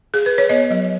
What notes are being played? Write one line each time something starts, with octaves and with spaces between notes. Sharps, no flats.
G#4
B4
C#5
B3 D#5
F#3